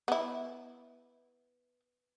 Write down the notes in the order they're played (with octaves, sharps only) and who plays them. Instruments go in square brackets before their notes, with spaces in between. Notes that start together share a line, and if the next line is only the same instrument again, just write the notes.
[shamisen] B3 E4